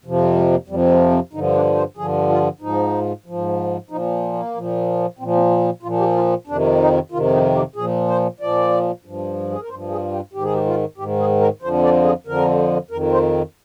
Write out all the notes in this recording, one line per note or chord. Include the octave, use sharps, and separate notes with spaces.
F2 C3 F3
G3
G#3
A#3
F2 C3 F3 G3
G#3
C4
G2 D3 F3 D#4
D4
C5
G2 D3 F3 G#4
F4
G#2 F3 D#4
G#2 F3
A#2 F3 D#4
A#3
A#2 F3
A#2 F3 C4
C4
C4
A#2 F3 F4
G4
F4
F2 C3 D#3 D4
D#4
F2 C3 D#3 F4
D#4
G4
A#2 F3 G#4
C5
A#2 F3 D5
G2 F3
G#4
A#4
G2 F3 C5
G#4
G4
G#2 D#3 G4
G#4
G4
F4
G#2 D#3 G4
G#4
A#4
F2 D3 F3 C5
D5
G#4
F2 D3 F3 A#4
F2 D#3 A#4
C5